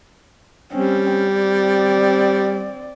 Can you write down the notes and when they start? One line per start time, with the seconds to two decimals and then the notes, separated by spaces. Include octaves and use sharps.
0.73 G3 C4 C#4
1.28 C4 D5